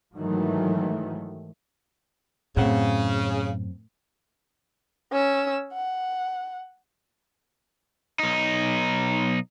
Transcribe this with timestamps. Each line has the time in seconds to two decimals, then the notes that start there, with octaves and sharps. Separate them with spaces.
0.14 G#2 D#3 E3 F#3 A3
2.57 F#2 A2 C#3 C4 F#5
5.12 C#4 E6
5.73 F#5
8.20 B1 D#4